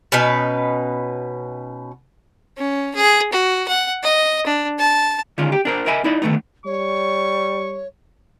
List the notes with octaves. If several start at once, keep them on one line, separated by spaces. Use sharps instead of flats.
B2 C#4 D#4 B4
C#4
G#4
F#4
F#5
D#5
D4
A5
D3 D#3 G#3 C#4 F4
G4
D4 A#4 C5
A#4 D#5 E5 G#5 B5
D#4 E4 D5 B5
D3 D#3 A3 B3 D#4
G3 C#5 C#6